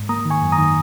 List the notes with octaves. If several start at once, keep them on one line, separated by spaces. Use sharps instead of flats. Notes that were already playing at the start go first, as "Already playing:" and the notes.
Already playing: G#2
A#3 A#5 D#6
D#3
G#5 C#6
F#2
A#5 D#6
D#3